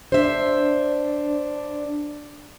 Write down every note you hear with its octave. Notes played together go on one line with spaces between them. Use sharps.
D4 C5 E5